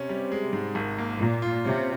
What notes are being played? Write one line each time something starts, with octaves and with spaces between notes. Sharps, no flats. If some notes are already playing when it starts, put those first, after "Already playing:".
Already playing: C3 C#4
G3
G#3
G#2
G#1
A#3
A#2 A#3
F4
C3 C#4